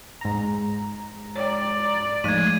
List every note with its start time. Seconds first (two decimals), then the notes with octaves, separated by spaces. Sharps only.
0.21 G#2 A#5
1.36 C#5 D5 G5
2.24 G#2 F3 A3 G#6 D#7